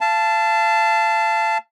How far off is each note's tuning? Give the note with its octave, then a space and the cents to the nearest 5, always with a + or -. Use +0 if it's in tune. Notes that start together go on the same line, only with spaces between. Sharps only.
F5 -35 A5 +0